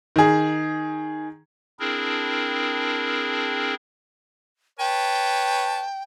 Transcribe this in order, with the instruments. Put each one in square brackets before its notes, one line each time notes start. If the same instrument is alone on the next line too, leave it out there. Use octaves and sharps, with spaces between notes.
[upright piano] D#3 G#4
[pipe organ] C4 D4 E4 G#4 A#4
[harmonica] B4 C#5 A5 [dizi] G5